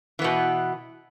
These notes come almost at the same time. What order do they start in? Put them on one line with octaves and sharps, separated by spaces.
E3 B3 B2